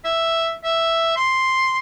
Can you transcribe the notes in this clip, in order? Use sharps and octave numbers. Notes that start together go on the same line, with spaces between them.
E5
E5
C6